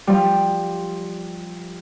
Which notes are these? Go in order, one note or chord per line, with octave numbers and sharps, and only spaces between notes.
F3 G3